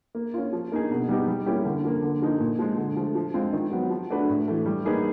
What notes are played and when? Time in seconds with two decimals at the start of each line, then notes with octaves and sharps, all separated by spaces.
0.15 A#3
0.34 C#4 F4
0.53 F3
0.72 A#3 D#4 G#4
0.91 B2
1.08 G3 B3 D#4 G4
1.28 G3
1.46 A#3 C#4 E4 G4
1.65 D3
1.84 F3 A#3
2.02 D3
2.22 F3 A#3 D#4
2.40 A#2
2.59 F3 G#3
2.78 D3
2.96 F3 A3
3.15 F3
3.34 G#3 C4 F4
3.53 D#3
3.71 F#3 B3
3.90 F3
4.10 A3 D4 F#4 B4
4.29 A2
4.48 E3 A3
4.66 G3
4.85 A#3 D#4 G#4 B4